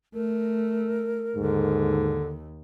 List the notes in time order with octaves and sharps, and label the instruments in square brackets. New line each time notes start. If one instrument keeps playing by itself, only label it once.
[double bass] A3 [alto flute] A#4
[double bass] D#2 [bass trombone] G#2 [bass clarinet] D3